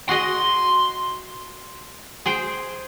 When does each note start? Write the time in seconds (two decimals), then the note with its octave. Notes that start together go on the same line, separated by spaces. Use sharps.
0.09 F#4 G#4 D#5 C6
2.26 G#4 C5 G5